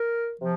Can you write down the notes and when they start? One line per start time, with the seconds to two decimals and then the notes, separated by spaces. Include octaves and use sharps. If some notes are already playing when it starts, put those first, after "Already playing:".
Already playing: A#4
0.40 C3 F3